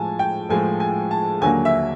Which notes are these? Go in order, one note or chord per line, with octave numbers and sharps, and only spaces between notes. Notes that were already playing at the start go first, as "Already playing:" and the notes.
Already playing: A2 F3 G#3 G#5 A5
G5
A2 F3 G#3 G#5
G#5
A5
D#2 D3 F#3 A#3 G#5
E5